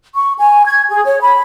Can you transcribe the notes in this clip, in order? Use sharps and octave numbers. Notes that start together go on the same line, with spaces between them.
C#6
G#5
G#6
G#4
C#5
B5